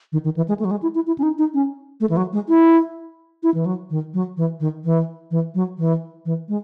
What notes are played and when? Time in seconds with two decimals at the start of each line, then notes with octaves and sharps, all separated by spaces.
0.12 D#3
0.24 D#3
0.37 E3
0.48 G#3
0.59 A3
0.65 F#3
0.71 G#3
0.82 E4
0.95 E4
1.07 E4
1.18 C#4
1.23 D#4
1.38 D#4
1.54 C#4
2.00 A3
2.10 E3
2.17 F#3
2.33 G#3
2.49 E4
3.43 E4
3.54 E3
3.66 F#3
3.90 D#3
4.14 F#3
4.37 E3
4.60 D#3
4.84 E3
5.31 E3
5.55 F#3
5.78 E3
6.25 E3
6.49 G#3